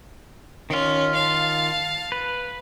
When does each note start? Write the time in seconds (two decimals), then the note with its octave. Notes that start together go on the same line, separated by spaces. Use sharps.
0.70 D#3 C#4 F4
1.15 F5 A5
2.12 B4